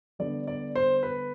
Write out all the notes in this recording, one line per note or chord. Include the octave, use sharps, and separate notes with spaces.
D3 G3 B3 D4 D5
D5
C5
B4